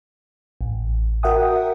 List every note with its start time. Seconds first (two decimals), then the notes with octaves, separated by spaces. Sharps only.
0.61 A1
1.23 F#4 A#4 E5 F#5 G5 D#6